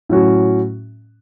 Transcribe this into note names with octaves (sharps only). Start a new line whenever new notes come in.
A2 F#3 C#4 F#4